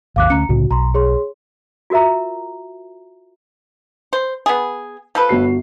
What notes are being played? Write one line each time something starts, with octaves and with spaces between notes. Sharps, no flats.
G#1 D#2 F5 D6 F#6
D2 C#4 A#5 C#7
C2 A2 C#3 F#4
B1 A#5 C6
G#4 C#5 C6
F4 F#4 A#4 E5 A#5
C5
B3 G#4
F3 A4 B4
G1 F#4 C7